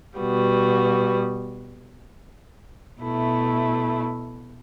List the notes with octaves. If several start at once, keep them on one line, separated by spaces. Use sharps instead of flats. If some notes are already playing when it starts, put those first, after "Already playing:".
B2 G3 B3 F#4
B2 A3 E4